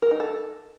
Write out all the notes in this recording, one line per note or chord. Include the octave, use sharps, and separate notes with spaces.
A#4
D#4
A4